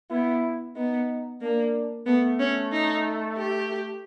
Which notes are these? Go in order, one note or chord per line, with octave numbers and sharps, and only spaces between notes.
B3 E4
B3 D#4
A#3 D4
A3 B3
C#4
D#4
G4